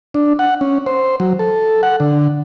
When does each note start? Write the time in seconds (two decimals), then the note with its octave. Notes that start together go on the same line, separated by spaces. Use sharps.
0.14 D4
0.39 F#5
0.61 C#4
0.86 C5
1.20 F#3
1.39 A4
1.83 F#5
2.00 D3